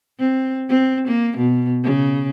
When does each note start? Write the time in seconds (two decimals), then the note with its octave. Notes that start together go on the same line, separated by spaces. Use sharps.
0.19 C4
0.69 C4
1.08 A#3
1.38 B2
1.84 C#3